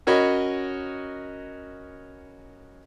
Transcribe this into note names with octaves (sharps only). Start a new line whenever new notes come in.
C#4 F#4 A#4 C#5 D#5 B5